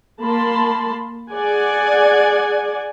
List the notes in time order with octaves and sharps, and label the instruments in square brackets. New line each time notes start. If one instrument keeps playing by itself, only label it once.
[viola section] A#3 A5 B5 C6
G#4 D5 F#5 G#5